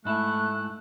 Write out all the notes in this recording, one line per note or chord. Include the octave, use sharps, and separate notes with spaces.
G#2 A3 E4 A5 F#6